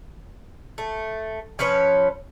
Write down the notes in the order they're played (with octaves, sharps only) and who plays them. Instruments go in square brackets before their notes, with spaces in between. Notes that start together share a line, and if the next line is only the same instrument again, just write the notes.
[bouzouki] A3
F3 C#4 B4 C#5